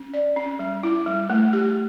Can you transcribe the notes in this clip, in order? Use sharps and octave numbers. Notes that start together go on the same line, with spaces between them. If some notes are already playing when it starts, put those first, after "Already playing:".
Already playing: C#4
D5
C#4
G3
E4
G3
A3
G4